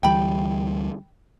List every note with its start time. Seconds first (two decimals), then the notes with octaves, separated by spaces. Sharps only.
0.03 D2 E3 G3 G5 B5